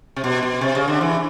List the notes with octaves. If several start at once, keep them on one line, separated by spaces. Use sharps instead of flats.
C3
B2
B2
C3
C#3
D3
E3